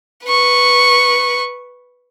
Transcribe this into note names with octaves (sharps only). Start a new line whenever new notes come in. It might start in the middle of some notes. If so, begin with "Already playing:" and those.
B4 C#6